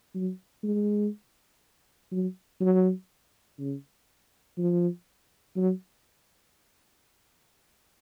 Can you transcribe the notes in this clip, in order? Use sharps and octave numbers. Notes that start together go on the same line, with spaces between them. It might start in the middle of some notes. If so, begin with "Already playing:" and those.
F#3
G#3
F#3
F#3
C#3
F3
F#3